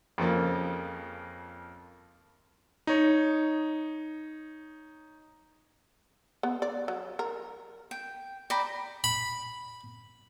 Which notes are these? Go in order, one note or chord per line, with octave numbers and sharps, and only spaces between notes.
F2 C#3 F3 A#3
D#4 C#5
B3
D5
F#3
A#4
G5
D5 G5 A#5 B5
B5